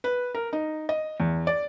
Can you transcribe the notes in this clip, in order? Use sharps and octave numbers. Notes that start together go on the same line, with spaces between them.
B4
A#4
D#4
D#5
E2
D5